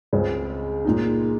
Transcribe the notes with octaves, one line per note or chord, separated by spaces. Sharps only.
C#2 C#3 G#3 C4
A#2 G#3 D#4